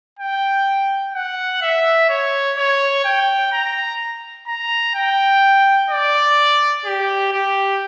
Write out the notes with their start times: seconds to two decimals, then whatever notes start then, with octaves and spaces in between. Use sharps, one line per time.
0.19 G5
1.14 F#5
1.62 E5
2.09 C#5
2.57 C#5
3.05 G5
3.52 A#5
4.47 A#5
4.95 G5
5.90 D5
6.85 G4
7.33 G4